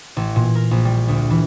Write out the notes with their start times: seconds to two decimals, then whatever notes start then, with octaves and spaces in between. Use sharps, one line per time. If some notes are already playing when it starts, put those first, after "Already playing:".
0.17 A1
0.36 A#2
0.55 A#4
0.71 A#1
0.85 G3
1.08 D2
1.30 E3